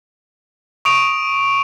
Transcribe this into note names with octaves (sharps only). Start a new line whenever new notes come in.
C#6 D#6 D7 F7